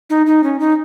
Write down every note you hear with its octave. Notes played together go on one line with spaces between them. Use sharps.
D#4
D#4
C#4
D#4